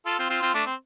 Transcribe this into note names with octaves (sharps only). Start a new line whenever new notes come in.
F4 A4
C4 F4
C4 F4
C4 F4
A3 D4
C4